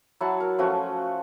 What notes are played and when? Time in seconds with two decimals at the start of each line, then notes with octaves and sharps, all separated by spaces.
0.21 F#3 E4 F#5 A5
0.40 A#4
0.58 F3 A3 C#4 F#4